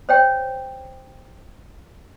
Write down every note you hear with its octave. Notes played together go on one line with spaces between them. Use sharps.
C5 C#5 G5